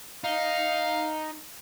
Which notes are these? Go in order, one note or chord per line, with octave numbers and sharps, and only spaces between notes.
D#4 F5